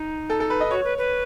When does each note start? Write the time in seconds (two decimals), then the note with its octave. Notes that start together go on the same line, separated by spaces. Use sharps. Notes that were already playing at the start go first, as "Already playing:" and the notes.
Already playing: D#4
0.30 A4
0.40 A4
0.50 B4
0.60 D#5
0.71 F#4 C#5
0.84 B4
0.98 B4